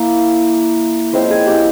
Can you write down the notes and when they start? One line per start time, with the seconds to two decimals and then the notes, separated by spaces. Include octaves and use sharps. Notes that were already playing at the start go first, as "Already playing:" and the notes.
Already playing: A#3 E4 A#4
1.13 F3 G#3 C4 C#4 E4 C5
1.30 G#4 G#5
1.47 G4 G5